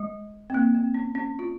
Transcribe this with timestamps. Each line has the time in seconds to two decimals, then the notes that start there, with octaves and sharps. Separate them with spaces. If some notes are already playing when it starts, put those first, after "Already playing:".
Already playing: G#3
0.50 C4
0.54 A#3
0.74 C4
0.94 C#4
1.15 C#4
1.39 F4